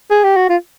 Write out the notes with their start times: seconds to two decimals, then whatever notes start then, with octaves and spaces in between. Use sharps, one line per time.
0.11 G#4
0.24 G4
0.36 F#4
0.50 F4